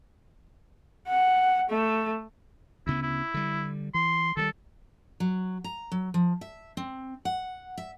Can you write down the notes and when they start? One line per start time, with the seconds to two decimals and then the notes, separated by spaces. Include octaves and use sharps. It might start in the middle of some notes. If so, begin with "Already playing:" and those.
1.08 F#5
1.70 A3
2.87 D2 C#3 B3 E4
3.02 E4
3.34 D3 G3
3.94 E3 C6
4.37 D#3 F#3 G3 A4
5.20 F#3
5.64 A#5
5.92 F#3
6.14 F3
6.41 E5
6.77 C4
7.25 F#5
7.78 E5